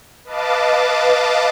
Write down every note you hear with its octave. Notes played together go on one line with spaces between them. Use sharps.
B4 D#5 F5 A5 D6